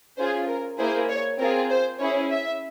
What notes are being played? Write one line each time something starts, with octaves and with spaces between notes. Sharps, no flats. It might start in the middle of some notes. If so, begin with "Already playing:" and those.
C#4 F4 G#4 C5
A#4
A#3 E4 G#4 C5
C#5
C4 F4 G#4 A#4
C5
C#4 E4 G#4 C#5
E5